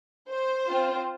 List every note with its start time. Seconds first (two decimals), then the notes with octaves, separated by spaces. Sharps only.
0.29 C5
0.68 C4 F4